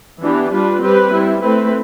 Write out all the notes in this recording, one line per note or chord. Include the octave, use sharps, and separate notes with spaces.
E3 B3 D4 G4
G3 D4 F4 B4
G3 C4 G4 B4
G3 C4 E4
A3 C4 E4 B4